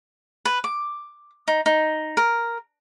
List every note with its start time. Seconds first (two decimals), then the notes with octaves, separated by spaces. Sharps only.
0.45 B4
0.64 D6
1.48 D#4
1.66 D#4
2.17 A#4